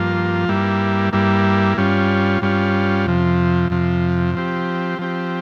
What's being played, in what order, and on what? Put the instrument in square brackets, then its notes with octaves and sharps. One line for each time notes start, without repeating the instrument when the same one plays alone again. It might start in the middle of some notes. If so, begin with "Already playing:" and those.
Already playing: [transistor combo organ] G2 F3 A#3 F4
G2 G3 A#3 E4
G2 G3 A#3 E4
G2 G3 C#4 F4
G2 G3 C#4 F4
F2 C3 F3
F2 C3 F3
F3 C4 G4
F3 C4 G4